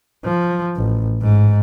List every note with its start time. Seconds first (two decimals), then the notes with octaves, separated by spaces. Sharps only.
0.25 F3
0.77 A1
1.22 G#2